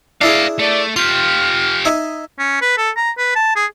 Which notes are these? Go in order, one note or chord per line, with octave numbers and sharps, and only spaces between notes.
D4 E4 G#4 D5 F5
A3 D5
F4 G4 C6 F6
D#4 E5 G#5
C#4
B4
A4
A#5
B4
A5
G#4